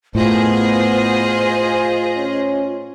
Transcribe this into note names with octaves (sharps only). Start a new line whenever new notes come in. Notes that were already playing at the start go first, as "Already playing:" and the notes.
A2 B3 F4 G#4 C5 D#5
C#4